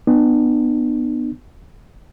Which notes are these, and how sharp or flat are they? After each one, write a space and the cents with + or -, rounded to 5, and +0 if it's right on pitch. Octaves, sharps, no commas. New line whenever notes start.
B3 +0 D4 +45